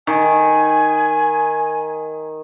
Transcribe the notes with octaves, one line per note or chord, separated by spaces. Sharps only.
D#3 G#5